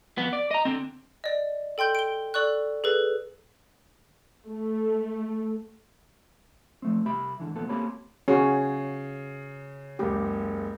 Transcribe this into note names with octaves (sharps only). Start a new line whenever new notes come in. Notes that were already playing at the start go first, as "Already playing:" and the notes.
F2 B3
D5
D#5 A#5
D3 C4
D5 D#5
A4 G5 C6 G6 G7
D7 G7
A4 D5 C#6 F#6
G#4 A4 B4
A3
F3 A3 C4
C2 G4 E5 B5
G#2 D3 E3
D2 A#2 F3 B3 A4
A#3 C4 G4 A4 C#5 B5
C#3 C#4 F#4 G#4
F#1 C#2 G4